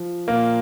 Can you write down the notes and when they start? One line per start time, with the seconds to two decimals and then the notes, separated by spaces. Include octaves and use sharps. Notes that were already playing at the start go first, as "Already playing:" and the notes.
Already playing: F3
0.28 A#2 A#3